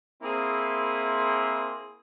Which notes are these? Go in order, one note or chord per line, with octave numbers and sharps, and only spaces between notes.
A#3 C4 E4 G#4 C6